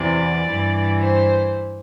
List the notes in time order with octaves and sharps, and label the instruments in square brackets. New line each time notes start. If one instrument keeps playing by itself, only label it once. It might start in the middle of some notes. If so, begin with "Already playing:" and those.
Already playing: [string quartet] E2 C3 E3 D5
G2 E3
C5